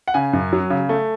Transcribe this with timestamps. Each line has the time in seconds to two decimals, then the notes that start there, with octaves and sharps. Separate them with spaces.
0.08 F#5
0.14 C#3 G#5
0.33 F#2
0.53 F#3
0.70 C#3
0.89 A3